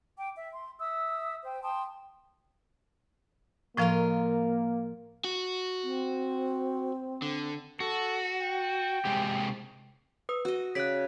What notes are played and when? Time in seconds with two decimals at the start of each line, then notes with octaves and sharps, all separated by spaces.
0.17 G5 D6
0.35 E5
0.53 C6
0.79 E5 D#6 E6
1.45 C5 G5
1.63 G5 A5 C6 D#6
3.77 A2 F3 A#3 F4 A#4 D#5 F5
5.24 F#4
5.84 C4
7.22 D3
7.80 F#4 A4
8.41 G5
9.05 C3 G#3 G4
10.29 B4 D#6
10.45 F#4 D#5
10.75 C#3 D5 F#6 B6